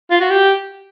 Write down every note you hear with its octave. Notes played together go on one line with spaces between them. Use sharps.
F4
F#4
G4